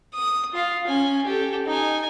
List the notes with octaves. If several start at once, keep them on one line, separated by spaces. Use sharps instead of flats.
D#6
F4 F5
C#4 G#5
G4 A4
D#4 G#5